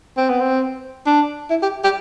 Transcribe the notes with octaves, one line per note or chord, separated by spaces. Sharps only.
C4
B3
C4
D4
E4
G4
G4